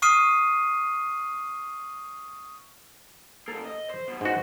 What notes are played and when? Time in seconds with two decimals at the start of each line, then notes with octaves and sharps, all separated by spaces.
0.02 C#6 D#6 F6 C7 D#7
3.48 C#3 A#3 A4
3.65 D#5
3.90 C5
4.08 F#2 B2
4.21 G#2 F#4 B4 C5